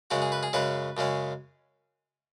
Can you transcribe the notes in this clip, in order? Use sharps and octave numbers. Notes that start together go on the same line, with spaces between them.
F#2 C#3 G#3 C#4 F#4
G#4
B4
G#4
F#2 C#3 G#3 C#4 B4
F#2 C#3 G#3 C#4